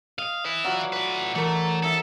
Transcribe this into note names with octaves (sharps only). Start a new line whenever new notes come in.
D#5 F5
E4 B4
F#3 F4 D5 F#6
A2 B4
E3 A3 A#4
D#4 A4 E5